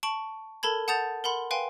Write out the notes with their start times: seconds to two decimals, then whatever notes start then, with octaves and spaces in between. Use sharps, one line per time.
0.03 A5 C#6 D7 F#7
0.63 A4 A#4 A5 B5 G#6
0.88 F#5 A5 D#6 G6 A6 F7
1.24 A#4 F#5 B5 C6
1.51 B4 F5 G5 G#5 C6